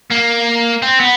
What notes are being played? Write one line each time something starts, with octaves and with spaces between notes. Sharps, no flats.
A#3
C4
B3